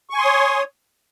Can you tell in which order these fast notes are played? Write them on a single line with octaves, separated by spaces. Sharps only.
C#6 G#5 C6 D#6 C#5